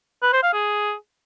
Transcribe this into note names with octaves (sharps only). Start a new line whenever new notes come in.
B4
C5
F5
G#4